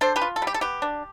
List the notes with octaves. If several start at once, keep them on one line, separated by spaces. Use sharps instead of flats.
D4 A4 C5
G4 B4
F4
A4
G3
G4
A4
B3 G4
D4